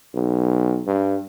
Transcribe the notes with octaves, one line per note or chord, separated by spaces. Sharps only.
B1
G2